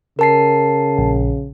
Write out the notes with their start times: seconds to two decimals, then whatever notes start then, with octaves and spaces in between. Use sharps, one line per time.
0.19 C#3 A#4 A5 C7
0.98 A#1